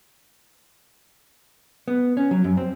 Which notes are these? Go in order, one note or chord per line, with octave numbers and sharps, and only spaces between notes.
B3
C#4
F#3
F#2
C4